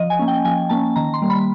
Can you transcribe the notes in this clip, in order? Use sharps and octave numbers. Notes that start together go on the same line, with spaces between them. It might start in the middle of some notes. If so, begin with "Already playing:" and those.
Already playing: F3 D#5
G#5
A#3 C#4
G5
F3 G#5
A#3 C#4 A5
D#3 A#5
C6
G3 A#3
B5